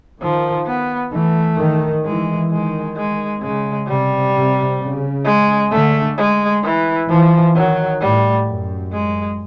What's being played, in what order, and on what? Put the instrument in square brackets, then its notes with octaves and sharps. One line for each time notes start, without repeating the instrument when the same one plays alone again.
[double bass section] D#3 [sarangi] F3
[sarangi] B3
[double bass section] E3 [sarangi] A3
[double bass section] D#3
[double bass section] E3 [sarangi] G#3
[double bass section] D#3 [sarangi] G#3
[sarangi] G#3
[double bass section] C#3 [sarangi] G#3
[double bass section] C3 [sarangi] G3
[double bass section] C3
C#3
[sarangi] G#3
[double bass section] D3 [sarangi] A3
[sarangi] G#3
E3
[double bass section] E3 [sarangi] F3
[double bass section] D#3 [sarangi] F#3
[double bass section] A2 [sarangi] G3
[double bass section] F#2
[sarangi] G#3